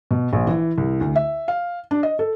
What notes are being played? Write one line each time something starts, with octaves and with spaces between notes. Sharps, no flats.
B2
A#1
E3
C2
D2
E5
F5
D4
D#5
A4